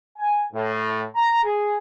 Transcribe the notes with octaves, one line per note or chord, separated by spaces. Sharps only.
G#5
A2
A#5
G#4